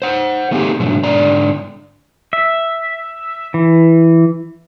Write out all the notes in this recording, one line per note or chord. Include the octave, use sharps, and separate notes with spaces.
C5 F#5
A3 A#3 C4 D#4 G4 G#4
G#2 B2 D3 F3 F#3 A3
G#2 D3 D5 A#5
E5
E3